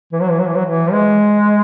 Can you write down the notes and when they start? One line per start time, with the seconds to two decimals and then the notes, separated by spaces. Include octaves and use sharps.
0.12 E3
0.21 F#3
0.30 E3
0.40 F#3
0.48 E3
0.56 F#3
0.66 E3
0.92 G#3